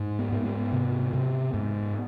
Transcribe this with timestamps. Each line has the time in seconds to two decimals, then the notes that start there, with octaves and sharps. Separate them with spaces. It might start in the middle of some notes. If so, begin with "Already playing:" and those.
Already playing: G#2
0.19 B3
0.32 G#2
0.45 B3
0.72 C3
1.14 C3
1.54 G#2